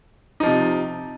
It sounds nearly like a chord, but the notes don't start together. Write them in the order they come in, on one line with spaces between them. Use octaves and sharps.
D#4 F3 C3